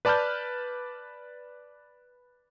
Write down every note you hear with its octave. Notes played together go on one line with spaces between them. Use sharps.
B4 D5 A5 B5 F6 G6